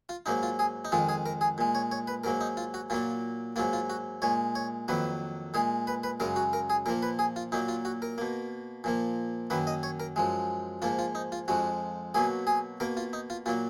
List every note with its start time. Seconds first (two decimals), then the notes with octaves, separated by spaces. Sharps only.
0.09 F4
0.26 G#2 F#3 A#3 D#4
0.43 F4
0.59 G#4
0.85 D#4
0.92 F2 D#3 G#3 F4
1.09 G#4
1.26 A#4
1.41 G#4
1.58 A#2 G#3
1.75 C#5
1.92 C#5
2.08 B4
2.24 G#2 F#3 A#3 A#4
2.41 D#4
2.57 F4
2.74 F#4
2.90 A#2 F#3 A#3 F4
3.56 G#2 F#3 A#3 F4
3.73 F4
3.90 F#4
4.22 A#2 G#3 C#5
4.55 C#5
4.88 F2 D#3 F#3 A#3 B4
5.54 A#2 G#3 G#4
5.87 B4
6.04 B4
6.20 F#2 C#3 G#3 A#4
6.36 F#4
6.53 A#4
6.70 G#4
6.86 A#2 F3 A#3 A#4
7.03 B4
7.19 G#4
7.36 F4
7.52 A#2 F#3 A#3 D#4
7.68 F4
7.85 F#4
8.02 A#4
8.18 B2 A#3
8.84 A#2 F3 A#3
9.50 F#2 D#3 A#3 B4
9.67 D#5
9.83 C#5
10.00 A#4
10.16 F#2 F3 G#3
10.82 G#2 F3 A#3 F4
10.99 F4
11.15 D#4
11.32 F4
11.48 F2 F3 G#3 F#4
12.14 B2 F#3 A#3 G#4
12.47 G#4
12.80 B2 A#3 A#4
12.97 F4
13.13 D#4
13.30 F4
13.46 A#2 F#3 A#3 F4